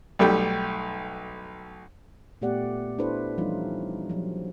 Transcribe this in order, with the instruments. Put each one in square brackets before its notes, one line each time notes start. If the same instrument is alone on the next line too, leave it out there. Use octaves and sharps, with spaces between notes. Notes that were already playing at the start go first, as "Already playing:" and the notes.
[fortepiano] B1 G3 A3 G5
[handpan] A#2 A3 B3 G4 D5 F#5
D4 E4 A4 B4 C5
E3 F3 G3 C#4 D#4 F4
F3 F#3